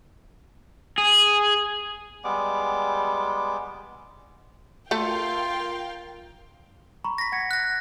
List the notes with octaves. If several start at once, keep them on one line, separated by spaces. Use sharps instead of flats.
G#4
G3 G#3 B3 D6
A3 F4 A4 A#4 F5 G5
A#5 B5 C#6
A#6 B6
F#5 G#6 C#7
F#6 A#6